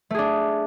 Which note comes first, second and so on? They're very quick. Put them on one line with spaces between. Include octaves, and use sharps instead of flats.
A3 G#4 D4